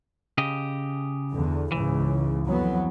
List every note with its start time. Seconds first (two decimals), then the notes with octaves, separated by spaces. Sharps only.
0.38 C#3 G4 D#5
1.32 E2 D3
1.72 C#2 G#2 C#3 E3
2.46 F2 F#3 B3